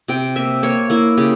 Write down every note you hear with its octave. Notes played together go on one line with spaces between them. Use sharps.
C3 G5
A#3 E5
A#3 C#5
A#3 E4
C#3 G4